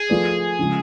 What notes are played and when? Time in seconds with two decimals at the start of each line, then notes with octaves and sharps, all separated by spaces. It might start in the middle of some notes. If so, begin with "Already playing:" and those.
Already playing: G#4
0.09 F3 A3 F4 B4 D5
0.59 C#3 F3 G#3